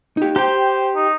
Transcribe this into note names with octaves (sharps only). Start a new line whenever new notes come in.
D#4 G4
G4 C5 G5 A#5
D#4